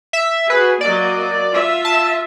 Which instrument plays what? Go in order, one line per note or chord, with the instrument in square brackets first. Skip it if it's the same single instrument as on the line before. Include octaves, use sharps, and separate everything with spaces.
[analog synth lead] E5
[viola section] F#4 G#4 [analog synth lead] B4
[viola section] F#3 A#3 D#5 [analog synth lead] D5
[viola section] F4 E5
[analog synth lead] A5